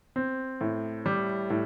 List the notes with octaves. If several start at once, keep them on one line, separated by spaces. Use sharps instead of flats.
C4
A2
G3
A2